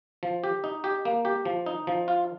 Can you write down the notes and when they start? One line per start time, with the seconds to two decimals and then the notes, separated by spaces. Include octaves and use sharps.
0.23 F3
0.44 G4
0.64 D#4
0.84 G4
1.05 A#3
1.25 G4
1.45 F3
1.66 D#4
1.87 F3
2.08 F4